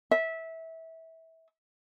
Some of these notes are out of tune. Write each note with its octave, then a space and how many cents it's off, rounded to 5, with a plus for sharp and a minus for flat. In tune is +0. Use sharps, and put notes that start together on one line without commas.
E5 -20